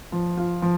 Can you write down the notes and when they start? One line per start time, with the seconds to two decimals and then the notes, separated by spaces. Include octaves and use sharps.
0.12 F3
0.37 F4
0.62 F3